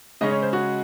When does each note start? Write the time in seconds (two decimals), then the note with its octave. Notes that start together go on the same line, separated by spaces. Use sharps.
0.21 C#3 G#3 C#4 D#5
0.31 C#5
0.42 C5
0.53 F#4